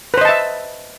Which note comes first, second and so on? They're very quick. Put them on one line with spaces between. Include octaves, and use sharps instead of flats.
B4 C5 D#5 A5 E5